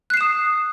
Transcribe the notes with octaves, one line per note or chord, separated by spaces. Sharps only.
D#6 F#6 C7 E7